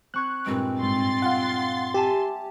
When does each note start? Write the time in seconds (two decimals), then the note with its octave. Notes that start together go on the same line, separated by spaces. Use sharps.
0.14 C4 C#6 F#6 G#6
0.46 G2 A#2 G#3 C4
0.82 G#2 C6 A6
1.22 F4 F5 F#5
1.94 G4 E5 G#5 A5